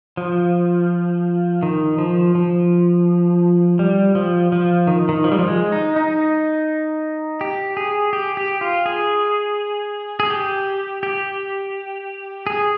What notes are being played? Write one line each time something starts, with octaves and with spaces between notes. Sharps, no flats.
F3
D#3
F3
F3
G3
F3
F3
D#3
D#3
F3
G3
F3
G#3
D#4
D#4
G4
G#4
G4
G4
F4
G#4
G#4
G4
G4
G#4